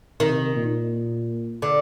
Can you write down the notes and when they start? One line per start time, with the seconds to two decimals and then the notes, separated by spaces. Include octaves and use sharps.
0.20 C3 D#3
0.56 A#2
1.62 D3